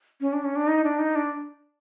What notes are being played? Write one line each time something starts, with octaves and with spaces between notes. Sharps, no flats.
C#4
D4
C#4
D4
D#4
D4
D#4
D4